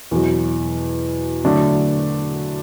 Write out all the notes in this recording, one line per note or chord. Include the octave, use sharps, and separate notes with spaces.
E2 B2 F#3
D3 F#3 A3 D4